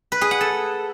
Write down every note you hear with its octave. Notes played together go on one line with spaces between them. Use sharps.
B4
G#4
F#5
A4